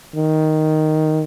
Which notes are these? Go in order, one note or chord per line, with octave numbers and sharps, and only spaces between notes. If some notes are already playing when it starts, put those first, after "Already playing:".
D#3